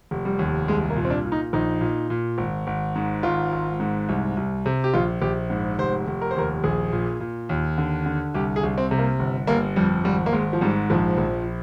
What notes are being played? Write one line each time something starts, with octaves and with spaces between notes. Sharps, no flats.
F1
G3
D#2
C2 G#3
A#3
A#2
C4
D4
A#2
D#4
A#1 D#4
A#2
A#2
G#1
G#1
G#2
G#1 F4
G#1
G#2
C2
C2
C3
G4
A#1 F4
A#1 G4
G#2
F1 C5
F1
A#4
C5
D#2 A#4
A#1 G#4
A#2
A#2
D#2
D3
D3
C2 G4
G#4
C2
C4
C3
A#3
G1
G1 A#3
F2 G3
G#1 G3
A#3
G#1 G#3
F3
G#2 G3
A#1 F3
A#1